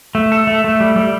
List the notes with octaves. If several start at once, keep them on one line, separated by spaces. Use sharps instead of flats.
A3
A4
A3
A3
G3
G3